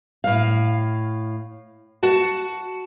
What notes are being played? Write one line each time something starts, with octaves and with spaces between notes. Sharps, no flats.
A2 F5
F#4 F#5 A5